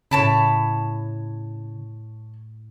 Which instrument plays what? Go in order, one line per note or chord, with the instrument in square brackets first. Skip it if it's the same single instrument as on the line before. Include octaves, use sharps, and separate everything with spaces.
[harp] A2 A#6 D7 [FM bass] C#3 [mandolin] C#5 A5 B5